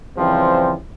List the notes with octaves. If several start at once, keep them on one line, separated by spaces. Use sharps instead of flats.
C#3 E3 F3 G3 C4